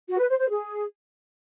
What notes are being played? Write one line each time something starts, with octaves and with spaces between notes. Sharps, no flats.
F#4
B4
C5
C5
G#4